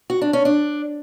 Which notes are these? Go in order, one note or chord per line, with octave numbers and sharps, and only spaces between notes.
F#4
D4
C#4
D4